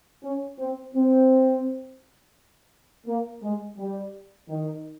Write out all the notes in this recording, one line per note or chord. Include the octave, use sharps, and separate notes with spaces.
C#4
C4
C4
A#3
G#3
G3
D#3